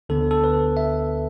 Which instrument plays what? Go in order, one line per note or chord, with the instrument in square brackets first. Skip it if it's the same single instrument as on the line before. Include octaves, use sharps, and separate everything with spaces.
[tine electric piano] D2 D3 B3 A4
A4
B4
E5